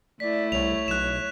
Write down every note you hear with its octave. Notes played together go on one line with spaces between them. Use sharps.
A3 E4 D5 B6
C2 C#5 F7
B1 F#6 E7